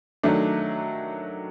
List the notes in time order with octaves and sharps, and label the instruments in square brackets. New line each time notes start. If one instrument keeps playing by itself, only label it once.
[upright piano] D#3 F#3 A3 D4